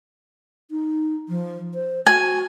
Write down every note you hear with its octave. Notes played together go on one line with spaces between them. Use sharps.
D#4
F3
C5
F#4 G#5